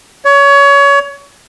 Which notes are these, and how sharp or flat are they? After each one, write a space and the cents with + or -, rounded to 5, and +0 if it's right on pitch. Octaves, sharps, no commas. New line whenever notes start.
C#5 +25